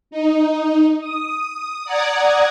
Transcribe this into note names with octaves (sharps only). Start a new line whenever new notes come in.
D#4
D#6
D5 F#5 A#5 D#6 G#6